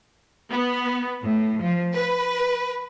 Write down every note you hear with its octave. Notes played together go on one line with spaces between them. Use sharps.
B3
A2
F3
B4